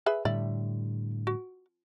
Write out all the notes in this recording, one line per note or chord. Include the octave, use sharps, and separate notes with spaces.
G#4 B4 E5
A2 D3 G3 D5 E5
F#4